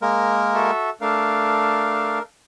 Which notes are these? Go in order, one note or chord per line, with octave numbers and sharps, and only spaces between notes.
G#3 A#3 A#4
F#4 A4 E5
A3 D4 A#4 F5